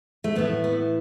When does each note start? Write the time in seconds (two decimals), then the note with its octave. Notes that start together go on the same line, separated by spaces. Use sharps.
0.24 A3
0.36 A2 E3 A3 B3
0.64 B3